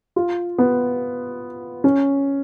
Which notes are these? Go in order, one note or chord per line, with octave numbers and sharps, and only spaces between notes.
F4
B3
C#4